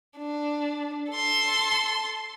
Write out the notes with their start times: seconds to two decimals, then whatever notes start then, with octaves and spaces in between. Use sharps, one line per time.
0.18 D4
1.11 A4 C6